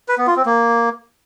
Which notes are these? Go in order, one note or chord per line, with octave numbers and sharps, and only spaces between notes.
B4
B3
F4
C4
A#3